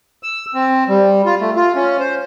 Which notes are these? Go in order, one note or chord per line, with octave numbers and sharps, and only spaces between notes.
E6
C4
G3
F4
A3
F4
C#4
C5